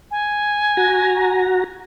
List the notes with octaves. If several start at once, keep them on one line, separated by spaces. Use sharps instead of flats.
G#5
F#4 A#5